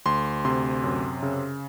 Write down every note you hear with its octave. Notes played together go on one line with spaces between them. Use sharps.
D2 C6
C3 C6
F#2
C#3